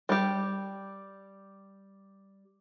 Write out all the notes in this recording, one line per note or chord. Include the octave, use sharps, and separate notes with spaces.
G3 G4